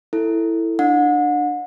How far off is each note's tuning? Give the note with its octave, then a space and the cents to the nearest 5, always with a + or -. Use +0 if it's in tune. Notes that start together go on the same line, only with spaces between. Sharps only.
E4 +0 A4 +15
D4 +20 F#5 -35